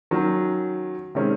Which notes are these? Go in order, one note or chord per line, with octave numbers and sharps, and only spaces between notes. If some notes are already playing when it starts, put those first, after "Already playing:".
D#3 F#3 C#4
C3 D#3 G#3 C#4